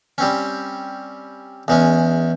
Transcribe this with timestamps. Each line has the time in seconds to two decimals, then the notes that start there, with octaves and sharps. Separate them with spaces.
0.18 G3 C4 C#4
1.68 E2 G#3 C#4